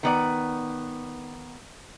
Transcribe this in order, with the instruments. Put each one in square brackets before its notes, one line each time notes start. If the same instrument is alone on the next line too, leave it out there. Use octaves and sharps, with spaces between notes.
[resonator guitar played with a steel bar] D#3 B3 D5